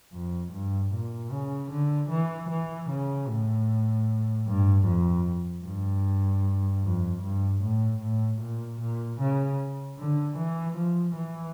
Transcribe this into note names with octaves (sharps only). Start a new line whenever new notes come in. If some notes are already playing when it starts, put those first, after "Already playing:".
F2
G2
A#2
C#3
D3
E3
E3
C#3
A2
G2
F2
G2
F2
G2
A2
A2
A#2
A#2
C#3
D3
E3
F3
E3